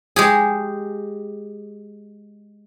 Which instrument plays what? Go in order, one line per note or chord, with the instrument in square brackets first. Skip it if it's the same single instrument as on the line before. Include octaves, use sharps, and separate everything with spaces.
[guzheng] G#3 G4 G#4